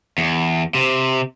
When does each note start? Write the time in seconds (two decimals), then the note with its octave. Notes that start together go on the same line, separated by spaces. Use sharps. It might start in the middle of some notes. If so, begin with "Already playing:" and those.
0.18 E2
0.75 C3